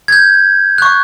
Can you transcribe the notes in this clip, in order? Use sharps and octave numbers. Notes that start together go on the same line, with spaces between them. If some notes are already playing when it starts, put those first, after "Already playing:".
G#6
G6
C#6 F#6